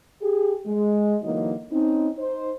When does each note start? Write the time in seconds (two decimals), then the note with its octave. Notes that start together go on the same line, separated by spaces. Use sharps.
0.21 G4 G#4
0.66 G#3
1.23 D3 E3 F#3 A#3 D#4 D#5
1.72 C4 C#4 D#4
2.18 D#4 C5